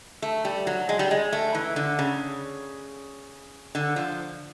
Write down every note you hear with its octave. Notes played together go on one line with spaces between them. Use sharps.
A3
G3
F#3
G#3
G3
G#3
A3
E3
D3
C#3
D3
F3